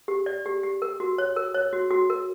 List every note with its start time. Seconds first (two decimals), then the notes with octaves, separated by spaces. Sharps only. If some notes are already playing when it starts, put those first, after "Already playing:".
0.08 G4
0.26 D5
0.46 G4
0.63 G4
0.82 A#4
1.00 F#4
1.18 C#5
1.36 A#4
1.54 C#5
1.73 F#4
1.91 F#4
2.10 A#4